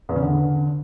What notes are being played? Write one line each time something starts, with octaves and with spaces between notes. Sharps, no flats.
E2
C#3
D3